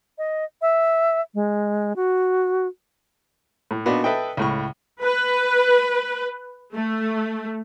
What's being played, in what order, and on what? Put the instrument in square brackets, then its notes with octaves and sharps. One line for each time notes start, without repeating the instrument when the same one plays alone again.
[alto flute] D#5
E5
G#3
F#4
[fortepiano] A2
A#2 B3 D4 D#4 F#4
A4 B4 D#5 E5 G5
C#2 A2 C#6
[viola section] B4
A3